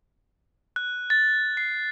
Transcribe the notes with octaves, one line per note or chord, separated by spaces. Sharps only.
F#6
A6
C7